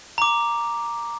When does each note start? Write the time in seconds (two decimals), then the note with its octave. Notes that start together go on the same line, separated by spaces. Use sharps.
0.18 A#5 D6